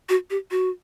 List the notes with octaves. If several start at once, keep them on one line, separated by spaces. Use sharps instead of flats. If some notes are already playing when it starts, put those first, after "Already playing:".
F#4
G4
F#4